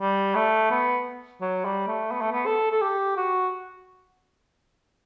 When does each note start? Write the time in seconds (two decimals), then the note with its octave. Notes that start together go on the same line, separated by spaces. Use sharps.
0.01 G3
0.35 A3
0.71 B3
1.41 F#3
1.65 G3
1.88 A3
2.12 B3
2.22 A3
2.32 B3
2.46 A4
2.72 A4
2.81 G4
3.17 F#4